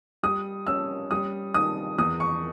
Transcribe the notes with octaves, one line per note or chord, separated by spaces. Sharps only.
G3 D#6
C#4 E6
G3 D#6
D#3 D#6
E2 D#6
C#6